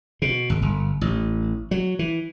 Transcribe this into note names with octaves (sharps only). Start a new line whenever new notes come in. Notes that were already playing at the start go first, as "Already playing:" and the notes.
B2
G#1
G1
A1
F#3
E3